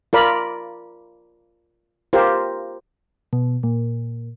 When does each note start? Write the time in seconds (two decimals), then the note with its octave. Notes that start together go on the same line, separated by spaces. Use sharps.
0.13 F4 A#4 D5 B5
2.13 F4 G4 A#4 C5
3.33 B2
3.63 A#2